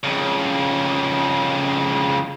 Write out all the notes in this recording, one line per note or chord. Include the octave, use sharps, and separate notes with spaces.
F2 C#3